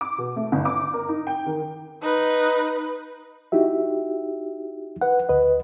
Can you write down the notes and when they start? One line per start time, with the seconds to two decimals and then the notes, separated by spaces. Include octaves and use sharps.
0.01 D6
0.18 B2
0.36 A3
0.52 G1
0.65 D6
0.94 A#4
1.09 D#4
1.27 G5
1.46 D#3
2.02 D#4 B4
3.52 D#4 E4 F#4 G4 E5
5.01 B4 F#5
5.29 D2 B4 D#5